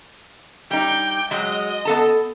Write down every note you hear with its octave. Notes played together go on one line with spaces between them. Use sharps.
G3 D#4 G5
F#3 G#3 D#5
B3 A4 A5